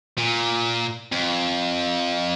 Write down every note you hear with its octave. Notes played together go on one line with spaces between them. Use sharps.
A#2
F2